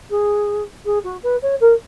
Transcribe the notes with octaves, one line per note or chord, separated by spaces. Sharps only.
G#4
G#4
F#4
B4
C#5
A#4